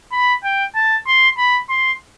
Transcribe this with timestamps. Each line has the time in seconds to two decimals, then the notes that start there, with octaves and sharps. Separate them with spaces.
0.12 B5
0.44 G5
0.75 A5
1.07 C6
1.38 B5
1.70 C6